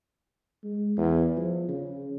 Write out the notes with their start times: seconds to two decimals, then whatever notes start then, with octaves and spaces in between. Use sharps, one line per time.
0.64 G#3
0.97 E2
1.37 F3
1.69 C#3